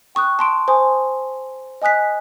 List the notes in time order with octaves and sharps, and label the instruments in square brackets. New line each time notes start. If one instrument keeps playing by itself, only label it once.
[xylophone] G5 C#6 D#6 F#6
A5 C6 D7
C5 G#5 C6 D#6
D#5 G#5 D#6 F#6 B6